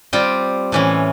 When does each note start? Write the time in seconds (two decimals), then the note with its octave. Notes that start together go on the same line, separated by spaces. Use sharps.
0.13 G3 C4 F4 G5
0.72 A2 E3 C#4